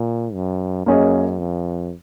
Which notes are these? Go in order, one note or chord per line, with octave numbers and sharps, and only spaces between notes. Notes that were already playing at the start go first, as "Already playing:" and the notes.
Already playing: A#2
F#2
F#2 A#3 C#4 G#4 D#5
F2